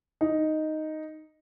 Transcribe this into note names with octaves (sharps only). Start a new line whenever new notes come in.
D#4